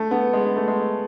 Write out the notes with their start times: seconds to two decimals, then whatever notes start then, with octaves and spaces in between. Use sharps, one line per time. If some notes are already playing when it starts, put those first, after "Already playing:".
Already playing: A3
0.11 B3
0.33 G#3
0.45 B3
0.56 A3
0.68 G#3